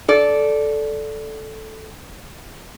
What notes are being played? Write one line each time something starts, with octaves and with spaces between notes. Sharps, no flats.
A4 D5